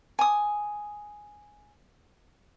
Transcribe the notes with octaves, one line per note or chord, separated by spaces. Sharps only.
G#5 D#6